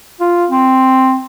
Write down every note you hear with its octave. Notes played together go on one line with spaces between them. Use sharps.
F4
C4